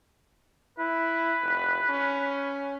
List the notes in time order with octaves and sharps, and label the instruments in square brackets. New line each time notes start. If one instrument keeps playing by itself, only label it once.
[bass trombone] E4 [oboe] B4
[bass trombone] F1
C#4